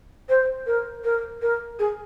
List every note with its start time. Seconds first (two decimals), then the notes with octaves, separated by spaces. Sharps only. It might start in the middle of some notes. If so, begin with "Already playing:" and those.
0.29 C5
0.67 A#4
1.04 A#4
1.42 A#4
1.79 G#4